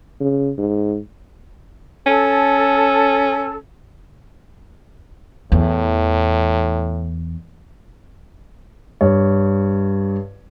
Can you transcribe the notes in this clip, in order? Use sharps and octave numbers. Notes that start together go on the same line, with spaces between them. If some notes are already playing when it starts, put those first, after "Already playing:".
C#3
G#2
C#4 A4
E2 A2
G2 C#5